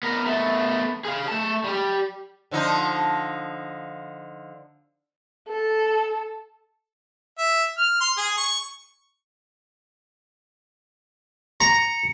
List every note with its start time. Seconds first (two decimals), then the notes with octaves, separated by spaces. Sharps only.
0.03 B3 A#4
0.26 A3 B3
1.05 G#4 F5
1.28 A3 A5
1.64 G3 G4
2.51 D3 F3 D#4
5.48 A4
7.38 E5
7.78 F6
8.01 C6
8.17 G#4
8.37 C#6
11.61 A#5 C#7